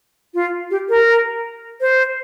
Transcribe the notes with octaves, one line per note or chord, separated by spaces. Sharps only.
F4
G4
A#4
C5